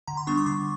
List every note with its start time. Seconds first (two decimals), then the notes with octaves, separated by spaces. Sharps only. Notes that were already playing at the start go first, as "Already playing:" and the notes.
0.08 D3 A#5
0.17 C6
0.27 G3 B3 D4 C#6
0.37 D6
0.46 D3 C#6